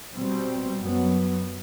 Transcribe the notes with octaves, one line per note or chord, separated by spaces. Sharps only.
B2 G3 C4
F#2 F#3 B3